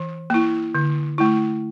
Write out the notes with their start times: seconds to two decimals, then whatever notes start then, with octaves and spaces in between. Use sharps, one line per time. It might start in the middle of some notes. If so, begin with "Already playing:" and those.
Already playing: E3
0.30 A#3 E4
0.75 D3
1.18 A3 E4